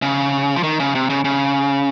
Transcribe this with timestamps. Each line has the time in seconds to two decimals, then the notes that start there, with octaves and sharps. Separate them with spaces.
0.02 C#3
0.56 F3
0.63 D#3
0.80 C#3
0.95 C3
1.10 C#3
1.24 C#3